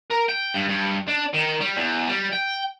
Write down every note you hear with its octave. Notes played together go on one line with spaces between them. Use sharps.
A#4
G5
G2
G2
D4
D#3
G3
E2
G3
G5